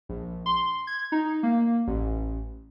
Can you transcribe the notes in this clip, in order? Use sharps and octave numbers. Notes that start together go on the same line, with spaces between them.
A#1
C6
G#6
D#4
A#3
A1